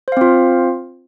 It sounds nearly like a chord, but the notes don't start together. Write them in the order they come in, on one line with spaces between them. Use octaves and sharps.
C5 F5 C4 F4